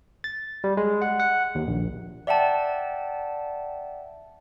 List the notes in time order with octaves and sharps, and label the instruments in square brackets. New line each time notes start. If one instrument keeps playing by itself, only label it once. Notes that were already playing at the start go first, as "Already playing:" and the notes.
[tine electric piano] A6
G3
G#3
F#5
F#5
D#2
A#1
[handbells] D5 E5 F#5 G5 A5